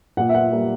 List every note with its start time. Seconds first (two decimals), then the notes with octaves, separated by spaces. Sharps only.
0.17 A#2 F#5
0.29 E5
0.34 F#5
0.52 G3 A#3